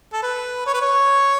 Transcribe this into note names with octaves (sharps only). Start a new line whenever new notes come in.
A4
B4
C#5
B4
C#5